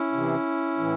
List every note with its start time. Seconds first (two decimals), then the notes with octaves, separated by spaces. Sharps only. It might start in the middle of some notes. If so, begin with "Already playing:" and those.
Already playing: C#4 E4
0.12 C3 E3
0.78 A2 E3